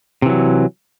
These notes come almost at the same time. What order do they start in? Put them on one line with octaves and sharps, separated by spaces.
C3 E3 F#3